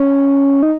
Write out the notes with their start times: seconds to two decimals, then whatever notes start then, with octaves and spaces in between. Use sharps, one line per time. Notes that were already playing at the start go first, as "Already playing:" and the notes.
Already playing: C#4
0.63 D#4